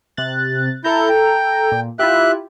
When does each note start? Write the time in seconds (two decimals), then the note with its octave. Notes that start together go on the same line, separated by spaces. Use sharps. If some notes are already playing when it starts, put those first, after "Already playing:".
0.17 C3 F#6 A6
0.84 E4 A4 A#5 G6
1.09 G5
1.72 A#2
1.99 E4 F4 G4 E5 F#6